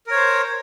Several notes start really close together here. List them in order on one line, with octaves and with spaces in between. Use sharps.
A#4 C#5 C5